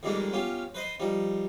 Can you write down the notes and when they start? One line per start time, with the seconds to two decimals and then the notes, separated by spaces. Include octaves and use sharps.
0.03 F2 G3 G#3 A#3 D4 D#4
0.33 B3 C#4 F4 G4
0.74 B4 C5 D#5 B5 C6
1.00 F3 G3 D#4